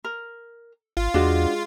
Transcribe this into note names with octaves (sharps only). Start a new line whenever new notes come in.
A#4
G#1 F4
E2 G#3 D4 F#4